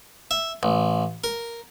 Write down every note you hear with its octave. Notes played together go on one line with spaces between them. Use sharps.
E5
A1
A#4